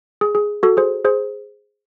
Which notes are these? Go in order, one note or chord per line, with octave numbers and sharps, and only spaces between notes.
G#4
G#4
F#4 A4
G#4 C5
G#4 C5